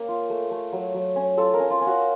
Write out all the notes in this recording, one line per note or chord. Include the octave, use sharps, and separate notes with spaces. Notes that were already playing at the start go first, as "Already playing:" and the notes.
Already playing: A#3 C#4
F4
A3
A3
F#3
F#3
C#4
F4 A4
A#4
C#4
F4
C#4
F#4